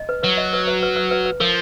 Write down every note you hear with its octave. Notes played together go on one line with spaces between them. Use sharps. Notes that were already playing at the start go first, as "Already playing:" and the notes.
Already playing: D#5
B4
F#3 B4
D#5
B4
B4
B4
B4
B4
B4
F3 A#4